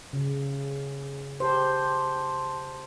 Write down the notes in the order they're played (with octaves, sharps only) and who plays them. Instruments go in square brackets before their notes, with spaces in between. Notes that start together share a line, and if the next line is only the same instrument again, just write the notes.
[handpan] C#3
[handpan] G4 C5 [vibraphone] A5 C6